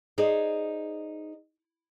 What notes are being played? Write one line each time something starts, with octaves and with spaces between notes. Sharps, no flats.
D#4 G#4 C5 D5